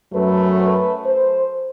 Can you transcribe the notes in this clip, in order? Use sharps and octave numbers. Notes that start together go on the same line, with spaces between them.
F#2 F#3 A3 B4
B4
C5